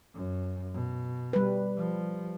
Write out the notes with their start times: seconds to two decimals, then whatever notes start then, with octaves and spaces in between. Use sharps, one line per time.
0.14 F#2
0.74 B2
1.33 G3 B4
1.77 F3